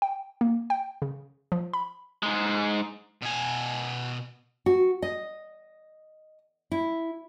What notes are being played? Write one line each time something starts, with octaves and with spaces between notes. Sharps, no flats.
G5
A#3
G5
C#3
F3
B5
G#2 G#3
B2 G#5
F#4
D#5
E4